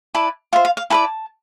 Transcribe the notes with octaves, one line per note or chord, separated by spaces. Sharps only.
E4 B4 D5 A5
F4 C5 E5
F5
F5
E4 B4 D5 A5